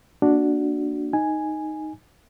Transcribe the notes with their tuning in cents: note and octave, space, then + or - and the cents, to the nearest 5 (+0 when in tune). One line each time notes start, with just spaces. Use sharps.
A#3 +0 D4 +0 F#4 +0
D#4 +0 G#5 +0